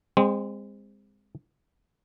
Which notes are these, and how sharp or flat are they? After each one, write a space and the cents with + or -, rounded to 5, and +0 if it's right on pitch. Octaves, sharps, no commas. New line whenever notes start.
G#3 -30 C4 +0